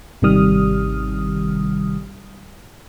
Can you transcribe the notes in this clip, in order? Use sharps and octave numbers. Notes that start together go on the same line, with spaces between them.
G#1 C3 D#3 G3 D#6 F6